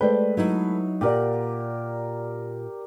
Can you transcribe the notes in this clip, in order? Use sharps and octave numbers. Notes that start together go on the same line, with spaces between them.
G#3 A3 B4 C5 D5 G5
F#3 D#4 E4
A#2 G4 A#4 D5 F#5